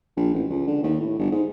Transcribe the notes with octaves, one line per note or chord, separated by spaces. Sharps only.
A#1
A1
C#2
D3
D#2
A2
G1
G#2